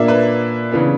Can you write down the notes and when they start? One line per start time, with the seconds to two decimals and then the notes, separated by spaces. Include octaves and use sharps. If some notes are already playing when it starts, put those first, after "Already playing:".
Already playing: A#2 A#3 D4 D5 E5
0.08 B4
0.72 C#3 E3 B3 D4